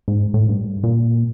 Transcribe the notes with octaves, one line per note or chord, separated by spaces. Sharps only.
G#2
A2
G2
A#2